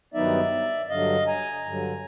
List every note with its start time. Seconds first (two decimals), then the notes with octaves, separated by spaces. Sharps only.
0.14 G2 D#3 F#3 B3 D#4 D5 E5
0.89 G2 D3 F#3 D#5 F5
1.27 G#5 A#5
1.66 G2 D3 F#3